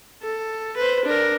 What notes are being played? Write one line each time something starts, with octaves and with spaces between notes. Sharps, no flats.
A4
B4 C5
D4 A#4